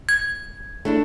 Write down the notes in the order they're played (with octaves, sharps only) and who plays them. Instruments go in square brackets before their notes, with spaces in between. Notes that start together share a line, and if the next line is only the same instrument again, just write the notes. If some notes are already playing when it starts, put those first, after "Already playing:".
[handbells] G#6
[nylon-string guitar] A3 D4 E4